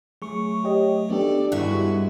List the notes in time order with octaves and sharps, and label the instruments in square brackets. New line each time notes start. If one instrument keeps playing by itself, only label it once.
[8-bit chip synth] F#3 A3 [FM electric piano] G#4 C#6
[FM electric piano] G4 C#5 D#5
[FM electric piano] B3 D4 G4 [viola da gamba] A4 D5
[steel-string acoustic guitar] G2 E5 [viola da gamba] G#3 F#4 [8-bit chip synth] E4